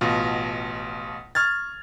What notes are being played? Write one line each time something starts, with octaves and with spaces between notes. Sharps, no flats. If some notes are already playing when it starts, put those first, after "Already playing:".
A1 B2 F4
C#6 F6 G#6 A6